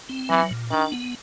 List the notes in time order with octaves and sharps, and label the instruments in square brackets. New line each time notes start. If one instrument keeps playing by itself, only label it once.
[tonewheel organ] C4
[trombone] E3 [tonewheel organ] F#3
[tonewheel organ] A#2
[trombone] D#3 [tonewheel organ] D4
[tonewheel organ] B3